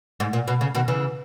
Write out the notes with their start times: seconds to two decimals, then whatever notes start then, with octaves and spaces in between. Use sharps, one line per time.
0.20 G#2
0.33 A#2
0.48 B2
0.61 C#3
0.75 B2 D#3
0.88 C#3 E3